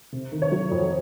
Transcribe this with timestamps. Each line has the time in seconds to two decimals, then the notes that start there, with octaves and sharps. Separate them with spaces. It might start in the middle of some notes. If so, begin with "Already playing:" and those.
0.12 C3
0.32 D#3
0.42 C#5
0.52 F#3
0.71 F2